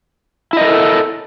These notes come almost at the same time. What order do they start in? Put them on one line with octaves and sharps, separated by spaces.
E4 D#5 A#4 A4